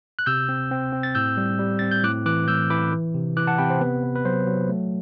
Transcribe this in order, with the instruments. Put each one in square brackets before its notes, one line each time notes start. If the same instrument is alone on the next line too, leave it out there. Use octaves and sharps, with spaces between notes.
[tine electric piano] F#6
C3 E6 G6
C4
C4
C4
A6
A2 E6 G6
G3
G3
C4 A6
G6
A2 D6 F#6
E3 D6 F#6
A2 E6 G6
E3 B5 D6
E3
C3
E3 D6 F#6
F#5 A5
C3 G5 B5
C5
B3 B4
B3
B4
F#3 C5
F#3
A3